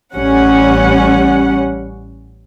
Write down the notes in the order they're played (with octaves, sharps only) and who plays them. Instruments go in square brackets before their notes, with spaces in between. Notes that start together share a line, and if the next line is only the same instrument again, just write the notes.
[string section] A1 G3 C#4 F#5